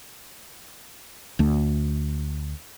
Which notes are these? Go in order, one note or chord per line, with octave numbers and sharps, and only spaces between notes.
D2 A3